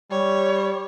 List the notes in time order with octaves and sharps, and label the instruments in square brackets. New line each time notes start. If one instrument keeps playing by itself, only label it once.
[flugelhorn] G3 [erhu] C#5